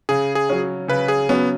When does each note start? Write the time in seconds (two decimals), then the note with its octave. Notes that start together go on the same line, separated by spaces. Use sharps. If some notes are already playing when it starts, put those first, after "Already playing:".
0.09 C#3 G#4
0.35 G#4
0.49 F#3 C#4
0.88 C#3 B4
1.08 G#4
1.29 F#3 B3 C#4